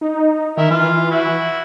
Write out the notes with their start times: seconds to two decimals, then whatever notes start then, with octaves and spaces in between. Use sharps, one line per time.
0.01 D#4
0.57 D#3 E4 A#4 E5
0.71 E3 F4 F6
1.11 E4 F#4